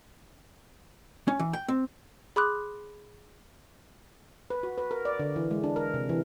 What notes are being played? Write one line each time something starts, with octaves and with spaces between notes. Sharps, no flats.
C#4
E3
G5
C4
G#4 B5 C6 D6 D#6 F#6
B4
F#4
B4
A#4
D5
D3
E3
G#3
D4
A#4
C3
E3